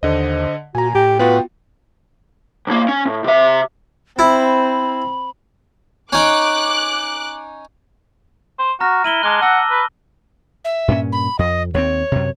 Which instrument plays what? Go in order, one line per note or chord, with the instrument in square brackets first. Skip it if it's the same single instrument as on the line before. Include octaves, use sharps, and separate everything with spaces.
[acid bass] D#2 [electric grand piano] D3 D#5 [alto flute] C5
[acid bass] A#2 [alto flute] F#4 [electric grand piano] G#5 A#5
[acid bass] A2 [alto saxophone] G4 [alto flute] G5
[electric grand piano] B3 F4 F#4 [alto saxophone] B4
[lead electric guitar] B1 A#3
C#4
A2
C3 E5
[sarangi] C4 [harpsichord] E4 [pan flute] B5
[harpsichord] C#4 D#4 [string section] D6 F#6
[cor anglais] C5
[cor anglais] F#4 [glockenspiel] A#5 F6 A#6
[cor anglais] E4 [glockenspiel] D#7 F#7 G7
[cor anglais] G#3 [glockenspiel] A5 D6 F#6
[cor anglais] F#5 [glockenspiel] A5 E6 A#6
[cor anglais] B4
[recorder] E5
[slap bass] G2 A#2 C#4
[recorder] B5
[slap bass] F2 [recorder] D#5
[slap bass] D#2 B3 C4 [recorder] C#5
[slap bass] F#2 C3